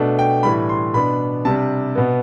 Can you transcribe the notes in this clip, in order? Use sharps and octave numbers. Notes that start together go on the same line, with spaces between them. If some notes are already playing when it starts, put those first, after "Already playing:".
Already playing: B2 A3 D4
G5
A2 E3 G3 B5
C6
B2 B3 D4 B5
C3 G3 D4 A5
B2 B3